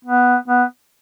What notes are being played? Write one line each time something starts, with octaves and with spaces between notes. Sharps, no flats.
B3
B3